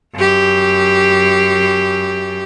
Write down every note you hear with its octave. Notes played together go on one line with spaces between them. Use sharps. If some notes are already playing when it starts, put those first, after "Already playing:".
F#2 G4